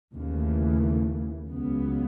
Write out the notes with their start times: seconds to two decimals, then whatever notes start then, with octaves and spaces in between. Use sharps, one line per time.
0.14 D#2 C#3 E3 A3
1.48 C#2 C#3 F#3 B3